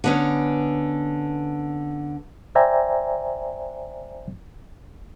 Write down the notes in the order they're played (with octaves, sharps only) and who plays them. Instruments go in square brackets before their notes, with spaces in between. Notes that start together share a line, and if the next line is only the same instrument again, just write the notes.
[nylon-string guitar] D3 B3 C#4
[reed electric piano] C5 D5 E5 G5 G#5 A#5